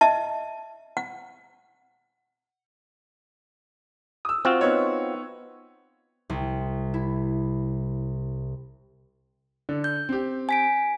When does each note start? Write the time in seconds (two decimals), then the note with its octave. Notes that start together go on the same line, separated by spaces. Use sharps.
0.01 D#5 E5 A5
0.97 F#5
4.25 D#6 E6
4.45 C4 F4 F#4
4.61 B3 D#4 C#5
6.30 C2
6.94 E4
9.69 D3
9.84 G6
10.09 C4 G4
10.49 G#5 B6 D7